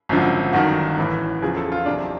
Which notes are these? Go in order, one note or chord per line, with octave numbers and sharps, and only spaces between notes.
G#1 F#2 D3 F3
G1 F#2 D#3 F#4
A1 A2 E3
E2 C#3 F3 G#4
A4
F4
F#1 E2 C3 D4